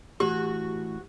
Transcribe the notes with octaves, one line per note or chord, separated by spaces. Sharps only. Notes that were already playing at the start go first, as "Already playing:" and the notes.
A2 E3 F#4 G4